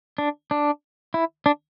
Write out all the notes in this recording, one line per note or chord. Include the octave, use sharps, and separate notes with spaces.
D4
D4
E4
D4